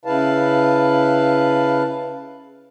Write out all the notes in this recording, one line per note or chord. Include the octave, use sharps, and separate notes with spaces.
C#3 E4 B4 F5 A5